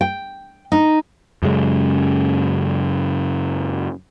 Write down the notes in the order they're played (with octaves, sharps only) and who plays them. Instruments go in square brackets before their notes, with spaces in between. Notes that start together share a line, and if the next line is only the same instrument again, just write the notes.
[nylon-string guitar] G5
D#4
[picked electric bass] F#2 C#3 G#3